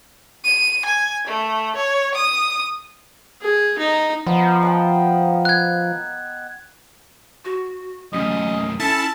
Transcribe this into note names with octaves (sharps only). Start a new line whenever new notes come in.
D#7
G#5
A3
C#5
D#6
G#4
D#4
F3 B3 D#5 A#5
D#5 F#5 G5
F#6 G#6
F#4
F#2 A2 C#4 D#5
C#4 E4 A4 A5